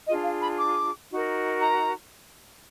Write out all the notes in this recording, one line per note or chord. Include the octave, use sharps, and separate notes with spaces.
D4 F4 G#4 D#5
F5
B5
D6
D#4 F#4 A#4
A#5